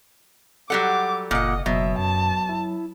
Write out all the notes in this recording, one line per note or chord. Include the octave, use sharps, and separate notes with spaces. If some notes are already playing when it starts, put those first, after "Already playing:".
F#3 G3 A4 F#5 D6
F#1 A#2 D#5 F#5
F#1 B2 F#3 E5
F#2 A5
E4